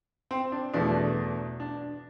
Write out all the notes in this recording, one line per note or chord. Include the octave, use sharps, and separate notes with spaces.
C4
D4
E2 B2 F#3 A3 D4
D4